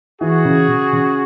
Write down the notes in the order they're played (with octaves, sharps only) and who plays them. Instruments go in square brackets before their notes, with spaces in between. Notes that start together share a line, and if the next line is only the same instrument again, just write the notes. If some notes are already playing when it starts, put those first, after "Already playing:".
[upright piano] E3 [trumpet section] F#4 G#4
[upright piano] C#3
C#3
C#3